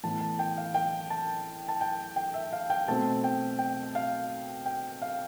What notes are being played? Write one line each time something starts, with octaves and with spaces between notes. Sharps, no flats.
A2 E3 B3 A5
A5
G5
F5
G5
A5
A5
G5
G5
E5
F5
G5
B2 A3 C4 A5
G5
G5
F5
G5
F5